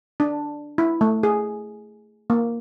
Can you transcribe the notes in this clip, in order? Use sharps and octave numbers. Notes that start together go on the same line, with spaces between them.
D4
E4
A3
G#4
A#3